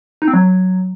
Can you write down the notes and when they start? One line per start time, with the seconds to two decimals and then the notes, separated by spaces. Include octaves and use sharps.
0.22 D#4
0.28 C4
0.33 F#3